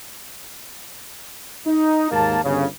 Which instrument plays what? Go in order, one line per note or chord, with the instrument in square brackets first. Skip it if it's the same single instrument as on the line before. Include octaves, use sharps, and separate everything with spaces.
[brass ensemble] D#4
D#2 G#2 A#3 A5
G1 C#3